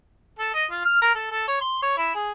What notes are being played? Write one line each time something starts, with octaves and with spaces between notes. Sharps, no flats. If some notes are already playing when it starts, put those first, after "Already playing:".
A4
D#5
F4
F6
A#4
A4
A4
C#5
C6
C#5
E4
G#4